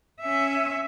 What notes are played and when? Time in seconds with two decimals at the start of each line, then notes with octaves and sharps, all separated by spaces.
0.21 C#4 E5